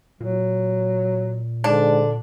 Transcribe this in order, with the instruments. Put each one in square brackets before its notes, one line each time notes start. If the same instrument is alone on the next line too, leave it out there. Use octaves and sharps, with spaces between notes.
[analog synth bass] A#2 [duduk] F#3
[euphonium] G#2 [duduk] D3 [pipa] D4